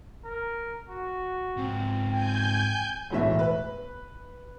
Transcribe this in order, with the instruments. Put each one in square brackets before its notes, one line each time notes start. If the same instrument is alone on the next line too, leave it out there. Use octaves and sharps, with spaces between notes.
[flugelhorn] A#4
F#4
[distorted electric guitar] G#2 F3 [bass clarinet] C4
[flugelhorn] G5 [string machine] G#5 G6
[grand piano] E1 B1 A2 E3 E5
B4